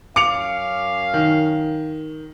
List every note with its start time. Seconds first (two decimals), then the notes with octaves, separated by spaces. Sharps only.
0.16 F#2 C#4 F5 D6 C#7 F7
1.14 D#3